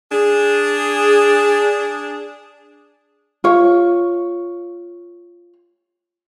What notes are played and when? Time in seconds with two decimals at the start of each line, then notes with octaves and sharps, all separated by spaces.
0.12 D4 G#4
3.44 F4 C#5